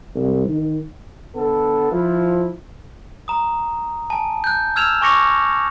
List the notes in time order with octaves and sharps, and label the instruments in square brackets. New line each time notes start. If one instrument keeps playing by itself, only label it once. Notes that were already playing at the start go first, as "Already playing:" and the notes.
[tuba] C2
D#3
[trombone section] D3 B3 A4
F3 E4
[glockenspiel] A#5 D#6
G#5 A5
F#6 G6
E6 F6 G#6 E7 F7
G#5 C#6 D6 A#6 C#7 F7